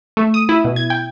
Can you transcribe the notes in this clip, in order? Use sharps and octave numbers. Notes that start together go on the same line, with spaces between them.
A3
D#6
E4
B2
G#6
G5